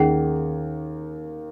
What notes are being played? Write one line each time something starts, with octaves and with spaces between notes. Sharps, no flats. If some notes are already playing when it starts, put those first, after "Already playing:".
Already playing: D#2 D#3 C#4 G#4 F#5